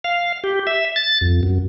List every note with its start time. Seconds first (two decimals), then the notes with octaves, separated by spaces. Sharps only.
0.04 F5
0.44 G4
0.67 E5
0.96 A6
1.21 F2
1.43 F#2